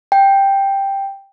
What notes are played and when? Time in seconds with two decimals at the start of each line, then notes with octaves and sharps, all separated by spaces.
0.12 G5